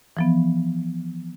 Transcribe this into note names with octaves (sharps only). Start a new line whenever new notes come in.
E3 F3 B3